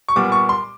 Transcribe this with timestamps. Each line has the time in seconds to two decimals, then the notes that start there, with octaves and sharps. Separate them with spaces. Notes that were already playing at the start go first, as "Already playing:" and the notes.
0.08 C#6
0.16 A#2 G3 B3 D6
0.32 C#6
0.49 C6